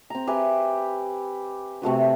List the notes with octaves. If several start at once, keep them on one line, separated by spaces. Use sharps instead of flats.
C4 A#5
G4 B4 E5 G#5
C3 A3 F#4 B4